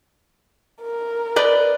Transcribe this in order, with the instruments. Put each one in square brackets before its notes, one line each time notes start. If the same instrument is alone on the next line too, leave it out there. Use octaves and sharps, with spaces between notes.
[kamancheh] A#4
[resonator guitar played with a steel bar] B4 D5 D#5